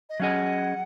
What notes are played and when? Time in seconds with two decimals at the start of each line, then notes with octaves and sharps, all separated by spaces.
0.09 D#5
0.20 F#3 C#4 G#4 D#5 F#5